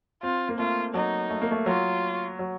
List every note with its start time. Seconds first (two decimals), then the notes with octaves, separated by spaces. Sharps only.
0.23 C4 F4
0.49 A#3
0.59 A3 F4
0.94 F#3 D#4
1.30 A3
1.42 A#3
1.51 A3
1.66 F#3 F4
2.39 F#3